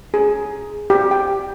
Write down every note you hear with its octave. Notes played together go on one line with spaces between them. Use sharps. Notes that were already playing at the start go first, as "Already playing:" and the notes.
G#4
G4
G5